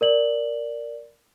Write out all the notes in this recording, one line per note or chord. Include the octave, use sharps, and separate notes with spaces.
A#4 D5 F#7